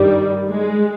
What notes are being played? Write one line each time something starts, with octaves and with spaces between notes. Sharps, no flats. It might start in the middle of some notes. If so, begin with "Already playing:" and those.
Already playing: G2 D#3 G3
G#3